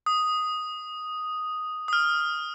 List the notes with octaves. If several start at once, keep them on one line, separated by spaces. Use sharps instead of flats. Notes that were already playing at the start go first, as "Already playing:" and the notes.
D#6
D#6
F6